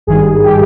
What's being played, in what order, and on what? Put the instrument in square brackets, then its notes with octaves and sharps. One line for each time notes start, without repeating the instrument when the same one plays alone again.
[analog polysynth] G#1 G2 D#3 G3 G#4
G4